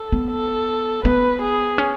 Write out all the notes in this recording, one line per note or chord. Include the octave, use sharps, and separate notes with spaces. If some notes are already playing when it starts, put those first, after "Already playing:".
Already playing: A4
B3
A4
B3 B4
G#4
C#4